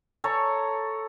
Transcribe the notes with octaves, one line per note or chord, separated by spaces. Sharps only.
A4 C#5 A#5 C#6